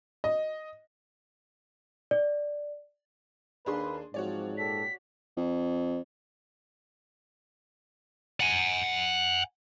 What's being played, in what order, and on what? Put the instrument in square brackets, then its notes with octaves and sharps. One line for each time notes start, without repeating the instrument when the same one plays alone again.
[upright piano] D#5
[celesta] D5
[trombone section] D#2 A#3 B4 [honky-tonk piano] D4 G#4 C6
[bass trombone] G#2 [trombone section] F3 F#3 C4 [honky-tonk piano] F#4 C#5 D5
[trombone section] A#2 G4 A4 [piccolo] B6
[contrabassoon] F2
[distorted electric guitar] F#5 G#5